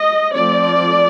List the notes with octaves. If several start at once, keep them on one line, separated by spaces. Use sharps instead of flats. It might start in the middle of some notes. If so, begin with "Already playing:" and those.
Already playing: D#5
F3 A3 C4 D5